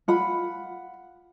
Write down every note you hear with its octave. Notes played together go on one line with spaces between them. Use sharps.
F4 F#5 B5